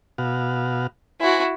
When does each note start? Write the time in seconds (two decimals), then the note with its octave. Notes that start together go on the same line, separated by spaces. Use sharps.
0.18 B2 F#4 F5
1.21 E4 F#4 C5 G#5